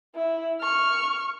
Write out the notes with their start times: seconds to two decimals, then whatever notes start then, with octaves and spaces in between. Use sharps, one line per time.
0.15 E4
0.61 C#6 F6